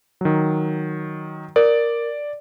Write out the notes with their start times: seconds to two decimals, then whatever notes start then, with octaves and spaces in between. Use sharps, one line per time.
0.21 D#3 F#3
1.56 A#4 D5